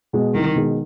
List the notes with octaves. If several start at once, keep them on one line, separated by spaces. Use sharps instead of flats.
B2 G#3
C2 D#3
B2 G#3